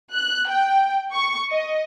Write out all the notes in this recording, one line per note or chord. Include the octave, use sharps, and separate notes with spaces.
F#6
G5
C#6
D#5